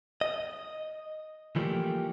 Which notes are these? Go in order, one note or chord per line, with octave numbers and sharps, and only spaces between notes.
D#5
E3 F3 G3 A3 A#3 G4